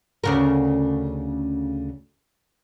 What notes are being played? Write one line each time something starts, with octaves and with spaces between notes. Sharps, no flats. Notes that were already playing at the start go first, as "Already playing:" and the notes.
D2 C#3 A#4